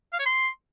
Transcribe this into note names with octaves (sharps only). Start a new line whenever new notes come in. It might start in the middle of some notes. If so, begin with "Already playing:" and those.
F5
C#5
C6